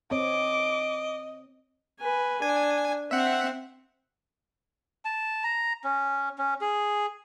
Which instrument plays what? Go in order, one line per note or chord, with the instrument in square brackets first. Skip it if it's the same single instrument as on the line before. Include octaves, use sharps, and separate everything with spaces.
[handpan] C4 C#5 [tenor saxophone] D#5 [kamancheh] D6
[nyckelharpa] B4 G#5
[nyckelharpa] D4 [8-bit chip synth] G#5
[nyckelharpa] C4 [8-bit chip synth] E5 F#5
[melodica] A5
A#5
C#4
C#4
G#4